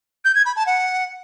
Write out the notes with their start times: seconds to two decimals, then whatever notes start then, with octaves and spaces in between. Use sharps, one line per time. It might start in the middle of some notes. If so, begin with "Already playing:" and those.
0.25 G6
0.35 G#6
0.46 B5
0.56 A5
0.66 F#5